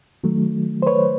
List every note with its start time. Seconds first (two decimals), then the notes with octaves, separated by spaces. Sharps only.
0.24 D#3 F#3 A3
0.82 C5
0.87 B4 C#5